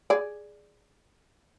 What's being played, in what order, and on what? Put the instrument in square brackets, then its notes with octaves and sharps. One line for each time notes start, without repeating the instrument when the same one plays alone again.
[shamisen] G#4 D5